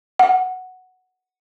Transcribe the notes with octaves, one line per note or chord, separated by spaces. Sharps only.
F#5